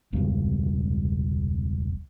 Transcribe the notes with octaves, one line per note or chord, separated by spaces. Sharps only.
E1 C#2 G2 C3